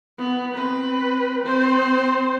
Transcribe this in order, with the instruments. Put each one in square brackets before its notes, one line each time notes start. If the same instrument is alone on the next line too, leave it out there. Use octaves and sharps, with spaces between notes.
[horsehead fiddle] B3
C4 B4
C4 C5